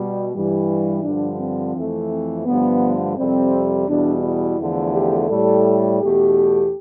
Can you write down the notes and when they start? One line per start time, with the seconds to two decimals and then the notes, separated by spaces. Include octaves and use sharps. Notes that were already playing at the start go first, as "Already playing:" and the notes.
Already playing: B2 G3
0.32 G2 E3 G3
1.03 G2 D3 F3 D4
1.38 C4
1.74 F2 E3 A3
2.09 C4
2.44 G2 D3 F3 A3 B3
3.16 F2 C3 G3 C4
3.87 E2 B2 G3 D4
4.22 E4
4.58 E2 D3 F3 A3
4.92 G4
5.28 A2 G3 A4
5.99 E2 B2 A3 G4